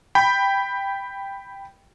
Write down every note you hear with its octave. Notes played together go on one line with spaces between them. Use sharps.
G5 B5